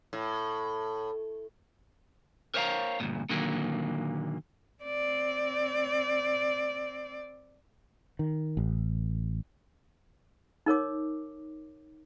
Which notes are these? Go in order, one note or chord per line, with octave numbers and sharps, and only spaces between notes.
A2
A#4 C5 C#5 E5 F5 A#5
D2 G2 A#2
A#2 D3 D#3 F#3 A#3
C4 D5
D#3
A1
D#4 A#4 C#5 D6